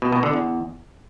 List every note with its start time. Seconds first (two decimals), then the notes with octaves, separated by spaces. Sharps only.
0.02 B2
0.13 B2
0.23 D3
0.33 E2